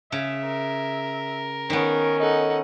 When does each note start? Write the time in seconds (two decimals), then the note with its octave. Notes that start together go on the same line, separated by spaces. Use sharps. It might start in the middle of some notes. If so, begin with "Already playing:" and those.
0.12 C#3 E5
0.45 A#4
1.70 D#3 B3 C#4
2.20 D#4 A4 D#5 F#5